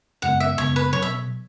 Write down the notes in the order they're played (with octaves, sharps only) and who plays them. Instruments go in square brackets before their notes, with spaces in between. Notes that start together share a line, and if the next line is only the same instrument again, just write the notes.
[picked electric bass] F#2 C#3 G#3 B3 [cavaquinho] F#5
[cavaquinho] E5
[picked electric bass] F#2 C#3 G#3 B3 [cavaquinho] C#5
[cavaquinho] B4
[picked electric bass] B2 F#3 [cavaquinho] C#5
[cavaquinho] E5